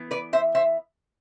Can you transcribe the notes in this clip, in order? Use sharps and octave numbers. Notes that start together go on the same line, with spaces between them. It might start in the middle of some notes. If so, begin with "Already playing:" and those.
Already playing: E3 B3
B4 D5
C5 E5
C5 E5